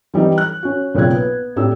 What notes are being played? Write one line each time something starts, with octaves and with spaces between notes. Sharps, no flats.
E3 G3 C4 D#4
F#6
C#4 F#4
B1 A#2 C#3 C4 F#6 G#6
B3
A2 C4 D4 G4 E6